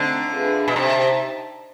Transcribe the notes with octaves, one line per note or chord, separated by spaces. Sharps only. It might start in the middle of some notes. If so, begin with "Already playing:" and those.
Already playing: D3 A3 C4 D#4
D4 F4 G#4 B4 E5
B2
C3 D#4 G4 C5 E5 A5